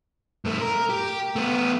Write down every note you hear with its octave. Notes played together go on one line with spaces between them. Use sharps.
G2 A3
A#4
G4
A3 B3